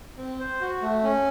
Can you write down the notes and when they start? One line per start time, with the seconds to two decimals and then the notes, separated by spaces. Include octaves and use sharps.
0.17 C4
0.39 C5
0.61 F#4
0.82 A3
1.03 C#4